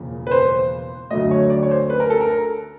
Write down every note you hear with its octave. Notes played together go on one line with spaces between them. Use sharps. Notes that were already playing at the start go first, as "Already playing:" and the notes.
Already playing: E1 E2 C#3 F3 A#3
B4
C5
D2 D3 F#3 A3 D#5
C#5
D5
C#5
C5
B4
A#4
A4
A#4